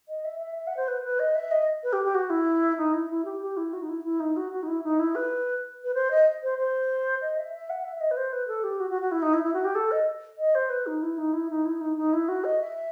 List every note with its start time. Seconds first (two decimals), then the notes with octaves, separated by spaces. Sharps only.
0.08 D#5
0.25 E5
0.40 E5
0.56 E5
0.67 F#5
0.77 C5
0.88 B4
1.04 B4
1.20 D#5
1.35 E5
1.51 D#5
1.83 B4
1.93 G4
2.04 G4
2.15 F#4
2.30 E4
2.78 D#4
2.94 E4
3.10 E4
3.25 G4
3.42 G4
3.57 E4
3.73 F#4
3.82 D#4
3.89 E4
4.04 E4
4.20 D#4
4.37 F#4
4.52 F#4
4.63 D#4
4.68 E4
4.84 D#4
5.00 E4
5.15 B4
5.84 B4
5.95 C5
6.11 D#5
6.43 C5
6.58 C5
7.21 D#5
7.38 E5
7.54 E5
7.70 F#5
7.84 E5
7.96 E5
8.01 D#5
8.11 B4
8.17 C5
8.33 B4
8.48 A4
8.64 G4
8.80 F#4
8.90 F#4
9.02 F#4
9.12 E4
9.22 D#4
9.34 E4
9.44 E4
9.54 F#4
9.65 G4
9.75 A4
9.92 D#5
10.38 D#5
10.55 C5
10.70 B4
10.87 D#4
11.02 E4
11.18 D#4
11.33 E4
11.50 D#4
11.65 E4
11.81 D#4
11.97 D#4
12.13 E4
12.29 F#4
12.44 D#5
12.61 E5